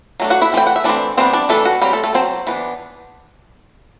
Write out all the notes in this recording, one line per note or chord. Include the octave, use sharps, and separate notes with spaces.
F#3 A3 D4
F#4 F#5
E4 E5
E3 A3 C4 G5
F#5
E5
E3 A3 C4 D4 D5
E3 G3 B3 C4 D4 C5
D4 D5
E3 G3 A3 D4 A4
F#4
F#3 G3 C4 G4
A3 A4
A3 A4
F#3 C4 C5
E3 B3 D4